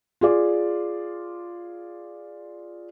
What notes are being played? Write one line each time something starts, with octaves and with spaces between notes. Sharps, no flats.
F4 G#4 D5